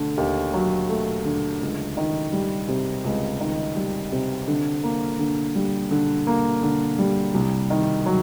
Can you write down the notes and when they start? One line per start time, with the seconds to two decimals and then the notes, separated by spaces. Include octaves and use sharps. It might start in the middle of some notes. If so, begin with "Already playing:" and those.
Already playing: D3 A3
0.17 D#2
0.54 F#3
0.89 A3
1.25 D3
1.61 C#2
1.97 D#3
2.33 G3
2.69 C3
3.04 C#2
3.40 D#3
3.76 G3
4.12 C3
4.48 D3
4.84 A#3
5.19 D3
5.55 G3
5.91 D3
6.27 A#3
6.63 D3
6.99 G3
7.34 C2
7.70 D#3
8.06 F#3